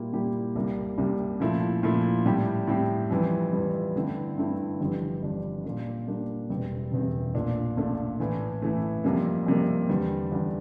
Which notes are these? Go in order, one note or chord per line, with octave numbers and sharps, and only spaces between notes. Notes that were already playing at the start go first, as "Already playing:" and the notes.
Already playing: A#2 G3 A#3 E4 G4
A#2 G3 A#3 E4 G4
C2 C3 G3 A#3
C2 C3 G3 A#3
A#2 F3 A3 E4
A#2 F3 A3 E4
A2 G3 C4 G4
A2 G3 C4 G4
F2 E3 G3
F2 E3 G3
G2 D3 A3 C4 E4
G2 D3 A3 C4 E4
G1 F2 E3 G3 D4
G1 F2 E3 G3 D4
A#2 G3 A#3 D4
A#2 G3 A#3 D4
E1 E2 C3 G3 C4
E1 E2 C3 G3 C4
A#1 A#2 A3 D4
A#1 A#2 A3 D4
A2 E3 A3
A2 E3 A3
F2 C3 G3 A#3
F2 C3 G3 A#3
E2 D3 G3
E2 D3 G3